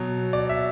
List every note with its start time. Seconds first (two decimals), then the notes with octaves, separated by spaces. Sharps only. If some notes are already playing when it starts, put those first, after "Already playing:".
Already playing: B2 F#3
0.33 D5
0.49 E5